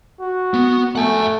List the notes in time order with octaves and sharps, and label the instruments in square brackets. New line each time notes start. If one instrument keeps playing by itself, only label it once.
[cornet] F#4
[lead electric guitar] B3
[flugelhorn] A3 [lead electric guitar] F#5 G#5